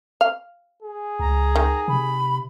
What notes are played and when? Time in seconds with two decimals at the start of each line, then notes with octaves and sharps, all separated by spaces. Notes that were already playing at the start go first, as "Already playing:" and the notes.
0.21 F5
0.83 G#4
1.19 C#2 A#5
1.56 D#3
1.88 C3 B5